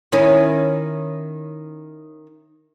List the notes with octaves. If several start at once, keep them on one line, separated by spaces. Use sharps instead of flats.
D#3 C#4 E4